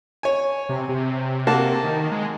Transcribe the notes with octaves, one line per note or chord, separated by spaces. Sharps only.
C#5 G#5
C3
C3
A#3 F#4 A5
D#3
G#3